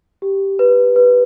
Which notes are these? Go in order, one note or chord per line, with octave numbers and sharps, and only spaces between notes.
G4
B4
B4